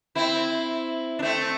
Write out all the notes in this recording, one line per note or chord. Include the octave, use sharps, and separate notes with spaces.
C4 E4
D4
A3 C4